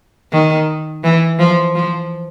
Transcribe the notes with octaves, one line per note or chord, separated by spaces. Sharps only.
D#3
E3
F3
F3